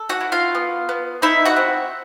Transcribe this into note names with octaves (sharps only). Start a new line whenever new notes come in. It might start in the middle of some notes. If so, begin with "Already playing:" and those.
Already playing: A4
F#4 F#5
E4
F4 F5
B3
B3
D#4 E4 E5
F#4 F#5
C4